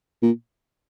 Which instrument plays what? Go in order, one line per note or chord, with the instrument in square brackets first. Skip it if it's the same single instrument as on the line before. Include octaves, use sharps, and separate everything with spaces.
[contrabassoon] A#2